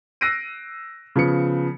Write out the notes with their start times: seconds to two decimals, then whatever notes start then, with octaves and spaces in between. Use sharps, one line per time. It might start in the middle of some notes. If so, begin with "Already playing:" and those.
0.21 E6 F#6 A#6 C7 D7 D#7
1.16 C#3 F3 B3 C#7